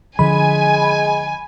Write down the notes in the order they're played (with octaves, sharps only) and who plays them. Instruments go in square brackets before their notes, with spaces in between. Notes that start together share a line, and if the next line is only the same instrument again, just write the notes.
[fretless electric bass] D3 F3 [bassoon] G#3 [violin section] G#5 [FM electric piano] B5